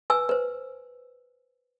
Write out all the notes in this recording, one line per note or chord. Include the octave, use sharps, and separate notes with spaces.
B4 G#5 E6
B4 C5